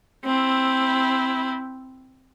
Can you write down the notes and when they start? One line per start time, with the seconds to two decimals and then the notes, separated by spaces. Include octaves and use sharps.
0.25 C4 E4